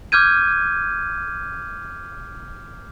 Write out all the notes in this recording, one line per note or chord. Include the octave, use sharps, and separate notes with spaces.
D6 F6 G6 G#6 D#7